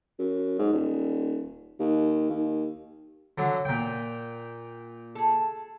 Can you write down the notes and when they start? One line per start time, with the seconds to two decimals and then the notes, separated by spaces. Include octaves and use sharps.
0.19 F#2
0.59 G#2
0.72 D#1
1.79 D#2
2.30 D#2
3.38 D3 F#3
3.65 A#2 G5
5.15 G#4 A4